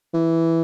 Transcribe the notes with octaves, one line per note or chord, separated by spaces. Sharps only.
E3